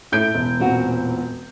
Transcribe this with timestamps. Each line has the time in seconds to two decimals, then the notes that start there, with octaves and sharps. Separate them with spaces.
0.12 A2 G6 D7
0.34 E1
0.60 A#2 C4 F#4